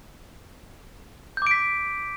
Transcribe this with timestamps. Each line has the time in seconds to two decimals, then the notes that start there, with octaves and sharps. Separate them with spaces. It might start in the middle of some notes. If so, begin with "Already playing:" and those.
1.37 G6
1.42 D6
1.47 D7
1.51 B6